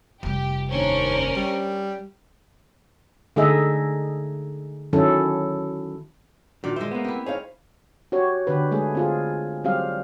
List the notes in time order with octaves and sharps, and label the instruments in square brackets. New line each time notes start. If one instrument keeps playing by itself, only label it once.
[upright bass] F1 G3 [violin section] G4
[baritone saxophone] D#2 [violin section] C#4 D4 A#4 [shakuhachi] C5
[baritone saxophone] G3
[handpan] D3 A3 D#4 G#4 D#5 E5
D#3 F#3 C#4 E4 A4
[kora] A#2 D5 [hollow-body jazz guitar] D#3 [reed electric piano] D4 F#4
[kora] G#3 C5 [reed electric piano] E5
[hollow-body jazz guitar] A#3 B3
[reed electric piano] C4 [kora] E4 G4
[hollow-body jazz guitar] D#4 [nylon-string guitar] G#4 C#5 F5 [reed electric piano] C5
[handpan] F#4 G4 C#5
D3 G4 B4
G#3 A3 G#4
C4 F4 G#4
F#3 G3 C4 G4 F5